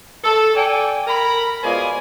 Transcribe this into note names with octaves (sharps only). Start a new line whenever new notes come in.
A4
D5 G5 G#5
A#4 A#5 B5
B2 G#3 F4 C5 D5 G#5